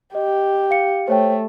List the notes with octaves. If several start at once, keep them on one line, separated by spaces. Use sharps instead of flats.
G4 D#5
F5 C#7
A3 C5 C#5 G5